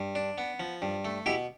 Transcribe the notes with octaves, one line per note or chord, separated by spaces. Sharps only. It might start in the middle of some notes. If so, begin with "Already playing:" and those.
Already playing: G2
D4
B3
F3
G2
A3
B2 E4 G4